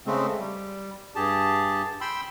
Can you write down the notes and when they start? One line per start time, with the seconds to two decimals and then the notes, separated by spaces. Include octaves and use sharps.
0.06 C#3 G#3 A3 C4
0.39 G3
1.15 G2 G4 G#4 A5
2.01 G5 B5 C6 E6